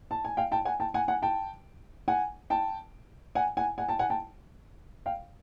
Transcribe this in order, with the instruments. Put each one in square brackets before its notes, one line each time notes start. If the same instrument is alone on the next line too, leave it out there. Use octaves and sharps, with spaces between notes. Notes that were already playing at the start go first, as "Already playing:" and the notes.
[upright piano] A5
G#5
F5 G5
G5 A5
F#5 G#5
G5 A5
F#5 G#5
F#5 G#5
G5 A5
F#5 G#5
G5 A5
F#5 G#5
F#5 G#5
F#5 G#5
G5 A5
F#5 G#5
G5 A5
F5 G5